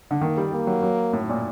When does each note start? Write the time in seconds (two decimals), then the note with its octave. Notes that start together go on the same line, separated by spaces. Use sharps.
0.11 D3
0.21 D#3 A#3
0.37 G3
0.52 G3 A#3
0.67 F#3
0.83 F#3
1.13 A2
1.29 A#2